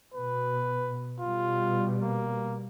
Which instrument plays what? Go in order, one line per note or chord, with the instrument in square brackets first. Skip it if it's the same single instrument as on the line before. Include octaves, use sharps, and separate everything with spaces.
[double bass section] B2 [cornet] B4
[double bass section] B2 G3 [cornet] F4
[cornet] A#3